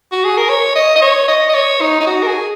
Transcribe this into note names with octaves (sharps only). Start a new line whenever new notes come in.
F#4
G#4
A#4
C#5
D#5
D#5
C#5
D#5
D#5
C#5
D#4
D#4
F#4
A#4
G#4